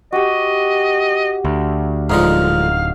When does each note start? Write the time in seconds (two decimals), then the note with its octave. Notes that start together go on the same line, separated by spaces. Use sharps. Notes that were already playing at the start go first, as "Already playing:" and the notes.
0.12 F#4 G4 D#5
1.45 D2
2.10 D1 G#2 D3 F3 D#4 F5